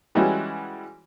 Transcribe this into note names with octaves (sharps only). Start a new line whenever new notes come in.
E3 G3 G#3 C#4 E4 F#4